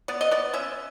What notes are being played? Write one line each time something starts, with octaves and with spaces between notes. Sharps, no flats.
B3 D5
D#5
B3 D5
C#4 E5